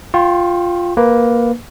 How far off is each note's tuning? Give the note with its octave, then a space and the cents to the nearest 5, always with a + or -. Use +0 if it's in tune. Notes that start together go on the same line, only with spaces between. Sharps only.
F4 +0 G5 +0 C#6 -45
A#3 +10 B4 +0